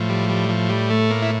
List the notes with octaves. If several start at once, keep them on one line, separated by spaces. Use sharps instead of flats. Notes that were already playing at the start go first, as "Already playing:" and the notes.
Already playing: A2 F3
G3
G3
F3
G3
A3
A#3
E4